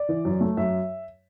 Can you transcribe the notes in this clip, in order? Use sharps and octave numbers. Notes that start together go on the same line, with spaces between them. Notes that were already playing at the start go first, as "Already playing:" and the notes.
Already playing: D5
E3
F#2
A3
F#2 E5